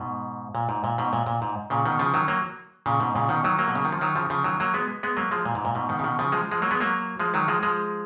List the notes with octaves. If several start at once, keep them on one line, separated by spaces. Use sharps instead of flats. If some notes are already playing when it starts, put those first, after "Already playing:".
Already playing: G#2 B2
A#2
G#2
A#2
G#2 B2
A#2
A#2
G#2
A#2 C#3
B2 D#3
C#3 F3
D#3 F#3
F#3 A#3
A#2 C#3
G#2 B2
A#2 C#3
B2 D#3
D#3 F#3
F#3 A#3
B2
C#3
D#3
F3
D#3 F#3
C#3 F3
C#3 F3
D#3 F#3
F#3 A#3
G#3 B3
G#3 B3
F#3 A#3
F3 G#3
A#2
G#2
A#2
G#2 B2
B2 D#3
C#3
B2 D#3
C#3 F3
F3 G#3
F3 G#3
F#3 A#3
G#3 B3
F#3 A#3
F3 G#3
D#3 F#3
F3 G#3
F3 G#3